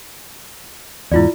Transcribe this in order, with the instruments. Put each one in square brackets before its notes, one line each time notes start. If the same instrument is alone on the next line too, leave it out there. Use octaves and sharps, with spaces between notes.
[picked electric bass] E2 G#2 [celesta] E4 F4 D5